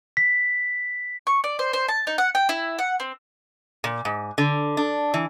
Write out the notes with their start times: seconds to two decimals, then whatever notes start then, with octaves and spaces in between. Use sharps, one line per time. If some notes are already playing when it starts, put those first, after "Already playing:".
0.17 B6
1.27 C#6
1.44 D5
1.59 C5
1.73 C5
1.88 A5
2.07 D#4
2.18 F#5
2.35 G5
2.49 E4
2.79 F#5
3.00 C4
3.84 A#2
4.05 G#2
4.38 D3
4.77 D4
5.14 E3